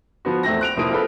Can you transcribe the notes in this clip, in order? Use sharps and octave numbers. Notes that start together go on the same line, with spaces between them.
F3 B3 F#4
E2 A3 C4 A#6
F#6 D7 F7
F1 F3 A#3 E4 D#6 D7
C4 F4 G#4 A4 B4